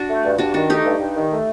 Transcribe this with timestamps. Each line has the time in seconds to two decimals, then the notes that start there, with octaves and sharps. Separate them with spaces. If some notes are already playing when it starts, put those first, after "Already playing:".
Already playing: D4 F#4
0.09 A3
0.24 G2
0.38 G2 D4 F#4
0.54 D#3 D4 F#4
0.70 A3 D#4 G4
0.85 G2
1.00 G2
1.16 D#3
1.30 A3